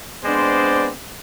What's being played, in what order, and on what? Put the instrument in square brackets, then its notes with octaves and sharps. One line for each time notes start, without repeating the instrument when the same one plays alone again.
[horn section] G#3 B3 C4 D4 C5 D5